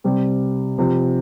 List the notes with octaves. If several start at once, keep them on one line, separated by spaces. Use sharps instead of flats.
C3 G3 C4
C3 F3 C4